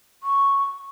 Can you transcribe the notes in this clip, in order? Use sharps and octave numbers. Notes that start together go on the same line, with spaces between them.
C#6